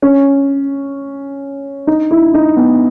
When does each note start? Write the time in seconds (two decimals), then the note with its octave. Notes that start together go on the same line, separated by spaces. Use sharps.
0.02 C#4
1.87 D#4
2.11 E4
2.34 D#4
2.57 B3